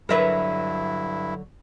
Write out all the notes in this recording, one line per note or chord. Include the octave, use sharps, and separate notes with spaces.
G2 D3 F#3 E4 A#4 B4 E5